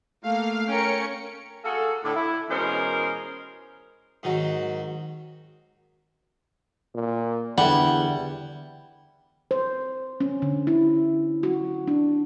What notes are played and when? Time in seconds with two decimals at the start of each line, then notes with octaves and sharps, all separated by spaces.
0.23 A3 A#3 F5
0.67 C#4 A#4 G5 C#7
1.65 A#3 F#4 G#4 A4
2.04 A2 D3
2.16 E4
2.50 B2 E3 G#3 C#4 A#4 C5
4.23 G#2 D#3 F#3
6.95 A#2
7.58 E2 D3 G3 E4 F#5
9.51 C5
10.20 C#4
10.42 D3
10.67 E4
11.43 F#4
11.87 D4